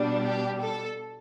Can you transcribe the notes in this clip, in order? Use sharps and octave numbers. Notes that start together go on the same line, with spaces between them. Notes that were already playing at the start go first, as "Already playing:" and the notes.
Already playing: B2 G3 D4
G4
A4